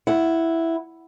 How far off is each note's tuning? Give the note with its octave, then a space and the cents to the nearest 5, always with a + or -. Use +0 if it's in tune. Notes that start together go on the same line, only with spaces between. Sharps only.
E4 +0 F#5 +0